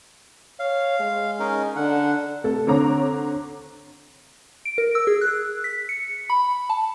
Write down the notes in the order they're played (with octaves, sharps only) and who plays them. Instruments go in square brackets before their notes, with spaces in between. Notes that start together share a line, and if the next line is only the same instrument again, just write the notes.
[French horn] C#5 [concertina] F5
[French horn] G#3
[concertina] C#4 D#4 A#4
[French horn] D3 [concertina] F#5
[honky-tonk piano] C3 A3 A4
D3 C4 C#5 A#5 D6
[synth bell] D7
A#4
E6
G#4
F#6
B6
C#7
B5
A5